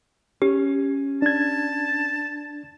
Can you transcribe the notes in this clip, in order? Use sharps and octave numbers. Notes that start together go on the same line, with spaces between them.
C#4 G4
D4 A5 G#6